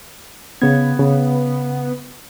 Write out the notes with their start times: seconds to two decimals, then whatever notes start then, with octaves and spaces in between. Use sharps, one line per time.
0.62 C#3 B3 G#6
0.99 C#3